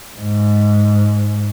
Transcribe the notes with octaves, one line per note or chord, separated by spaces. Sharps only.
G#2